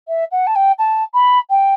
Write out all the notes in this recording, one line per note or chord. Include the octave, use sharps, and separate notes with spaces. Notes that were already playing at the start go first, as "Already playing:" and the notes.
E5
F#5
A5
G5
A5
B5
G5